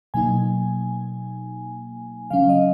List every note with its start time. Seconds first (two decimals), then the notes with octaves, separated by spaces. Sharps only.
0.14 B2 F#3 A#3 D#4 G#5
2.30 C#3 F#3 C#4 F5
2.49 D#5